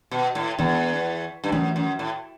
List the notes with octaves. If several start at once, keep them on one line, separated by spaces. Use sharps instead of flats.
B2
A2
E2 E3 B3 D4
G2
F#2 E3 A3 D4
F#2
A2